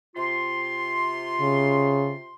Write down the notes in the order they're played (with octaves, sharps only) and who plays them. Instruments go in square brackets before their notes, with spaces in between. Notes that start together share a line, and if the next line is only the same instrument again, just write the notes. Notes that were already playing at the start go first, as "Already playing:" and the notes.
[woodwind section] C3 F4 C6
[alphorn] C#3